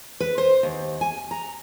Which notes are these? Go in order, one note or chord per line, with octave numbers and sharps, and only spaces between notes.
B4
C5
D#2
G#5
A#5